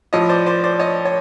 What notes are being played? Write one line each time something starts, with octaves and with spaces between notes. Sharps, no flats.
A2 F3 C#5 D#5
C5 D5
C5 D5
C5 D5
C#5 D#5
C#5